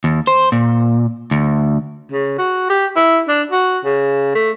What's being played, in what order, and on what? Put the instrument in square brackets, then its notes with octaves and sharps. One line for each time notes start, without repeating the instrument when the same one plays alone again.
[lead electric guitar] D#2
C5
A#2
D2
[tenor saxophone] C#3
F#4
G4
E4
D4
F#4
C#3
A3